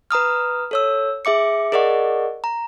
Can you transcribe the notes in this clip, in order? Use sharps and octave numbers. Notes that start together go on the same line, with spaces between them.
B4 A#5 D#6 F6
A4 C#5 E6
G#4 E5 D6 C#7
G#4 A#4 D5 D#5 F#5 C#6
A#5